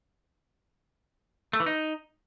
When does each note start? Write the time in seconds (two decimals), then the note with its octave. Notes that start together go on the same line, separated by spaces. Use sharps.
1.53 A3
1.60 E3
1.66 D#4